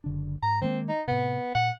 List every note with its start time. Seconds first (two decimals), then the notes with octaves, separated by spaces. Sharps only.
0.04 F#1 D3 D4
0.42 G#2 A#5
0.61 D#3 G#3 A#3 C4
0.88 D#4
1.07 A2 C3 B3
1.55 A#2 F#5